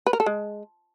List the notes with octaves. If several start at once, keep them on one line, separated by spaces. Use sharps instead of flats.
B4
A#4
A4
G#3